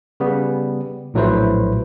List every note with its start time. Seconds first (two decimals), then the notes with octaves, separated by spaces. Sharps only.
0.20 C#3 G3 B3
1.14 A#1 A2 F#3 A3 B4 C5